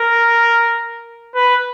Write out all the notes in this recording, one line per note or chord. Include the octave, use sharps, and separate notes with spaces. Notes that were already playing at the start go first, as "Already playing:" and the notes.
Already playing: A#4
B4